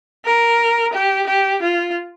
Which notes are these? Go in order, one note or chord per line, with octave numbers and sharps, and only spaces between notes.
A#4
G4
G4
F4